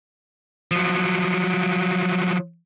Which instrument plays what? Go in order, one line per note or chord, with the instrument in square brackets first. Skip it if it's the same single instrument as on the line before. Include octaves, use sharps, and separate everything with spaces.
[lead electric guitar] F3 F#3